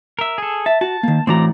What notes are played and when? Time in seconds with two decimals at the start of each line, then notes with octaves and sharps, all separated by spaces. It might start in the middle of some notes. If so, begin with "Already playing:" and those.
0.19 A#4 E5
0.38 G#4 A4
0.66 E5 A5
0.81 F#4 A5
1.03 D#3 A#3
1.27 A2 E3 C4 F#4 D5 A#5